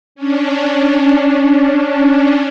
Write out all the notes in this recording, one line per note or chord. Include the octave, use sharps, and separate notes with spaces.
C#4 D4